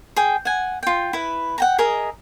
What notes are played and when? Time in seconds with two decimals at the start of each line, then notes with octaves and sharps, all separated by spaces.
0.16 G#4 G5
0.45 F#5 G#5
0.83 F4 G5
1.13 E4 B4
1.58 F#5 G5 A#5
1.78 G#4 A#4 D#5 E5